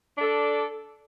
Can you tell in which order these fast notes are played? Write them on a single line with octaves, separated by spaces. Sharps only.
D4 A4 D5